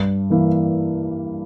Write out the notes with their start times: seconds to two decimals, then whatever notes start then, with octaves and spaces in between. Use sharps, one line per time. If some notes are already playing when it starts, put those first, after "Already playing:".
Already playing: G2
0.30 E3 A#3 E4